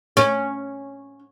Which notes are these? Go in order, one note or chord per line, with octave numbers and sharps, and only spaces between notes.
C#4